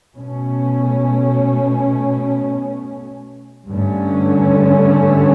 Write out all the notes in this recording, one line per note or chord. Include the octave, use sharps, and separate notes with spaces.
B2 A3 C#4
G2 D3 A3 C#4